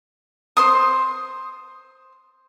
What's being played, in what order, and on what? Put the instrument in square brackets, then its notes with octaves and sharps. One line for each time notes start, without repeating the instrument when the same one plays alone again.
[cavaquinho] C5 C6 D#6